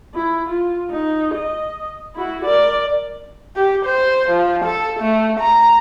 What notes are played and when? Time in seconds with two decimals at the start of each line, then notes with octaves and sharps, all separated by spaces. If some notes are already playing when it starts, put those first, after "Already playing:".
0.14 E4
0.49 F4
0.91 D#4
1.34 D#5
2.15 E4 F#4
2.44 A#4 D5
3.56 G4
3.86 C5
4.31 F3
4.65 A4
5.00 A3
5.40 A#5